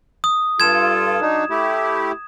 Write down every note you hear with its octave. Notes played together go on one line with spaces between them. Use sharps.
D#6
G2 F4 A4 G#6 E7
F#3 D4 D#4
A3 E4 G4